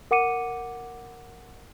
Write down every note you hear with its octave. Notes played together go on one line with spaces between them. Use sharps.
A#4 F#5 D6 C#7 D#7